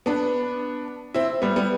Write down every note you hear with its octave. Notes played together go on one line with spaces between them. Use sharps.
B3 D4
C4 E4
G3 B3
G3 B3